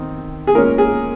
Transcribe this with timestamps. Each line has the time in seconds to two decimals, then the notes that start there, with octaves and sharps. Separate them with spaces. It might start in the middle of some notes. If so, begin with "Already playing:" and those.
Already playing: D#3 C4
0.47 G#4
0.55 A#2 G#3 C#4 A#4
0.78 G#4